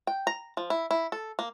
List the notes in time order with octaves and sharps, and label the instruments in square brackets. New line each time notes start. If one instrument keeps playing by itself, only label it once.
[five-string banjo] G5
A#5
F3
E4
E4
A4
A#3